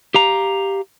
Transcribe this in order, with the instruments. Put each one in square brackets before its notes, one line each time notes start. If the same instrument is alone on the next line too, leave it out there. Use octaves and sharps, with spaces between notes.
[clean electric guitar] G4 F5 A#5